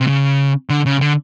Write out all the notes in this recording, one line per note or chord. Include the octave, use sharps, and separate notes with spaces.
C3
C#3
D3
C#3
D3